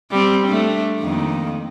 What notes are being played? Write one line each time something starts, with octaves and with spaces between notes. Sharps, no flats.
G3 C4
A3 D4
F2 D#3 A#3